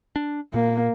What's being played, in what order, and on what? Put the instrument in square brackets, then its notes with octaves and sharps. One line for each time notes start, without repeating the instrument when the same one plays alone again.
[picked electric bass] D4
[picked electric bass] A#2 [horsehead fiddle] A#3